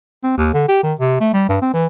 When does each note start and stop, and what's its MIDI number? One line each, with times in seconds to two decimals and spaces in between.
0.23 0.33 60
0.37 0.51 39
0.53 0.65 50
0.68 0.79 67
0.83 0.93 51
0.99 1.19 48
1.20 1.30 57
1.33 1.46 55
1.49 1.56 43
1.61 1.73 60
1.73 1.86 52